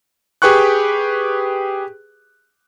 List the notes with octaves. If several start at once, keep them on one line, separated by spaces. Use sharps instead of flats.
G4 G#4 B4 G5 C#6 F#6